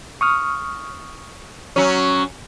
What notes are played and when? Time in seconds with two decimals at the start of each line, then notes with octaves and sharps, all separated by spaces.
0.21 C#6 D#6 F6
1.76 F#3 C#4